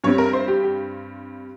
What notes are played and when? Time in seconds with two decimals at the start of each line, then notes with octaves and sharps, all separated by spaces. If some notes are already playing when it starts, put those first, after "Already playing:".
0.04 G2 G3 C4 C#5
0.18 A#4
0.33 C5
0.48 G4
0.63 G4